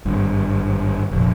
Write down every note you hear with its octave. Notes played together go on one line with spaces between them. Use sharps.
G#1 G2
F1 A#1